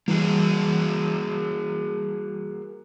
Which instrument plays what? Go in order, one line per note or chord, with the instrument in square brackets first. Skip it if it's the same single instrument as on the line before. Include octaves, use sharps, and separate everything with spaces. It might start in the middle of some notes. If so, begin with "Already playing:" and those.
[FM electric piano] E3 G3 [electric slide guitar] A#3 F#4 G#4